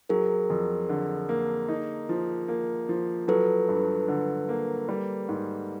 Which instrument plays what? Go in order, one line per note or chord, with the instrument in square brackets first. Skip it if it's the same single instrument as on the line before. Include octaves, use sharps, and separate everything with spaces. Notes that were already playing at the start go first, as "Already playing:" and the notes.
[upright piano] F#3 [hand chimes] G#4 A#4
[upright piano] F2
D3
A#3
D#4
F3
A#3
F3
[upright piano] F#3 [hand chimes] A4 B4
[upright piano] G2
D3
A#3
G3
G#2